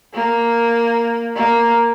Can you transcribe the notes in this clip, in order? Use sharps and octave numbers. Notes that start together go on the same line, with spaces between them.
A#3
A#3